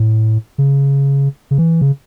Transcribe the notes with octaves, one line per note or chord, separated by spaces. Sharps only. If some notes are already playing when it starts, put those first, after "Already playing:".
Already playing: A2
C#3
C#3
E3
C#3